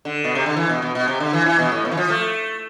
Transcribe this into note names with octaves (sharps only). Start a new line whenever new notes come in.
D3
B2
C3
D3
E3
B2
B2
B2
C3
D3
E3
E3
B2
A2
B2
E3
F3
A3